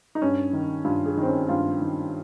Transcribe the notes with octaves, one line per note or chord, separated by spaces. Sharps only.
D#4
G2 C#4
D#3
G2 F4
G#4
D#3
C4
C#4
G2 F4
D#3